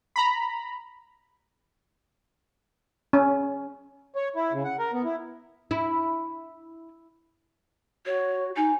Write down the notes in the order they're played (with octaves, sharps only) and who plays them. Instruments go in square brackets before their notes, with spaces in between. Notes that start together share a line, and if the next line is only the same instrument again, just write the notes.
[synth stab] A#5 B5
[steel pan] C#4
[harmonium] C#5
E4
C#3
F#5
A#4
B3
E4
[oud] E4
[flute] F#4 [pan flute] C#5
[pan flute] D#4 [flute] G#5